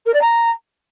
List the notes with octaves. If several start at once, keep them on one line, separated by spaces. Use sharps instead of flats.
A#4
D5
A#5